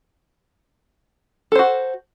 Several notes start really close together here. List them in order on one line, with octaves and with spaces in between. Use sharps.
A4 C5 F#4